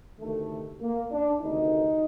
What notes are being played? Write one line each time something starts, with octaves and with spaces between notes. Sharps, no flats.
D2 C3 D#3 A3
A#3
D4
D2 C3 D#3 D#4